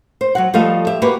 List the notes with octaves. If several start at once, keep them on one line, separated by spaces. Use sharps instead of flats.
C5
F#3 F#4 F#5
F3 G3 A3 A4 D#5 F5
G4 E5
A#3 F#4 G4 B4